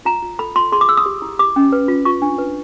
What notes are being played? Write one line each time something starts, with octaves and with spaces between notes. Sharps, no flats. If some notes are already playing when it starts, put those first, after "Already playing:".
F4 A#5
F4
A4 B5
F4 C6
G#4 C6
D6
G#4 E6
D#6
G4
E4
G4 D6
C#4
B4
F4
F4 C#6
D4
B4